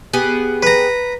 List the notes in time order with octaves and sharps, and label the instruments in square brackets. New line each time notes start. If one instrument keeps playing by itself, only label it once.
[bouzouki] B3 G4 G#4
[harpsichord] B4 A#5